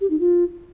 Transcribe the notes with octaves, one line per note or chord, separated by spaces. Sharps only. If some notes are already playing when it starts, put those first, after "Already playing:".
G4
D#4
F4